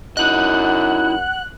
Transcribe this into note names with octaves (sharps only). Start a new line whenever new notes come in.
F#2 D#4 E4 D#5 F#5 F#6